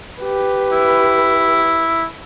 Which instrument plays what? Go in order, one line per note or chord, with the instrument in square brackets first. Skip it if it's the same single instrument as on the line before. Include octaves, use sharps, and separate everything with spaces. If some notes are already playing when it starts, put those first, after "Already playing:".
[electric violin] G4 B4
[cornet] E4